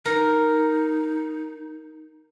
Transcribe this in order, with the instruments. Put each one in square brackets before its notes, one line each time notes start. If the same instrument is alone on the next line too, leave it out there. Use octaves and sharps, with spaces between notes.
[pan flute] D#4 [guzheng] A#4